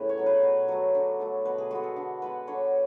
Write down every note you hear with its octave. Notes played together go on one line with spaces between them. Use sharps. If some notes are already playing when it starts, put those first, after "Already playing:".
Already playing: A2 C#3 A3 B4
C#5
F#3 B3
B4
B2
F#3 A3
D3
F#3 A3
B2 B4
G#4
G#3 B3 F#4
A4
D3
G#3 B3 B4
D3 C#5